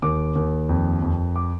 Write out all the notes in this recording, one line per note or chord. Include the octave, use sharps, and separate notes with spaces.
D#2 D6
D#2
F2
F2
D6